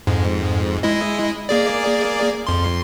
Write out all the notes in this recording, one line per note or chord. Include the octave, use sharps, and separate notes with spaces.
F2 G#2
G#3 E4 D#5
A#3 G#4 D5
F2 C6